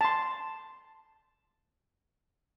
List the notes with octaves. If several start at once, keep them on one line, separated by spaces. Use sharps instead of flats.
A5 C6